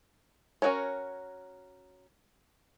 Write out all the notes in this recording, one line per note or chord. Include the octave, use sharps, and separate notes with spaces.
C#4 E4 F#4 A#4 C#5